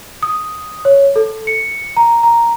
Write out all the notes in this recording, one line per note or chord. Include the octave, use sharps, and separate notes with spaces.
D#6
C#5
A4
C#7
A#5
A#5